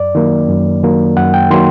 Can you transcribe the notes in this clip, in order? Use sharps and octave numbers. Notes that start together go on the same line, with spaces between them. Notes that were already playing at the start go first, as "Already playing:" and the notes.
Already playing: F#2 D5
D#3 F#3 A#3
F#2
D#3 F#3 A#3
F#2 F#5
G5
D#3 F#3 A#3 C6